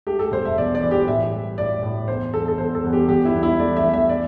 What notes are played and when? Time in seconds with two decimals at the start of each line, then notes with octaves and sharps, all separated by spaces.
0.07 A3 G4
0.19 A4
0.32 E1 C5
0.45 E5
0.57 E2 D5
0.75 D5
0.82 E3
0.91 G4
1.07 A2 E5
1.32 G3
1.58 A2 D5
1.83 A2
2.08 E2 C5
2.34 E2 A4
2.48 A4
2.58 E2 C5
2.75 A4
2.84 E2
2.93 G4
3.09 E2 G4
3.25 E4
3.34 E2
3.43 E4
3.59 A3 D5
3.77 E5
3.84 E2
3.93 E5
4.09 D5